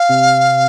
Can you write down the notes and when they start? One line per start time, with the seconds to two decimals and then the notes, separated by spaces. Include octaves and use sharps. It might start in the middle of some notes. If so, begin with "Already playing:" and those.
Already playing: F5
0.09 C3